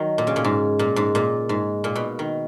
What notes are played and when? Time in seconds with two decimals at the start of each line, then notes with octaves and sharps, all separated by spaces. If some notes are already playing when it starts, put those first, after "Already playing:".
Already playing: D#3 F#3
0.18 A#2
0.27 C#3
0.36 A#2
0.45 G#2
0.79 A#2
0.96 G#2
1.15 A#2
1.49 G#2
1.84 A#2
1.96 B2
2.19 D#3